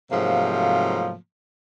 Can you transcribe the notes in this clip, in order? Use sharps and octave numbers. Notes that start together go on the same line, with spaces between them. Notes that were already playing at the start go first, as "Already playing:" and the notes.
G#2 C3 F3 F#3 A3 A#3